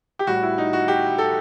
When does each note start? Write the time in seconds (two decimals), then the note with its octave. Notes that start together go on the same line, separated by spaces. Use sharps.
0.19 G4
0.27 A2 G3 F#4
0.43 E4
0.58 D#4
0.73 F#4
0.88 G4
1.18 A4